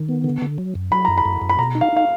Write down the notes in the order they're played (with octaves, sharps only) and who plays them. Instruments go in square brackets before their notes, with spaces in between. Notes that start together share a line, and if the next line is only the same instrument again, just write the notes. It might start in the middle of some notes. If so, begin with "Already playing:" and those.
Already playing: [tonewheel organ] D#3
B3
D3
D3
F#3
F#2
[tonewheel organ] F#3 [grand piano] B5
[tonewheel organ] F#2 [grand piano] A#5
[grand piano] B5
[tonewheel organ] F#2
F#2
[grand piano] B5
[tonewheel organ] B2 [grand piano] A#5
[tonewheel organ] D#4
[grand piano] F5
[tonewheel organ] D#4 [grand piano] F5